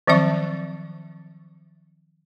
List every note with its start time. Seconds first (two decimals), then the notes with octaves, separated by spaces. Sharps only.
0.07 D#3 F3 F#3 C4 E5 C#6